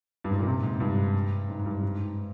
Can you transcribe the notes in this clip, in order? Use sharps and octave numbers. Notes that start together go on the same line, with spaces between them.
G2
G#2
A#2
C3
G#2
G2
G#2
G#2
G2
G#2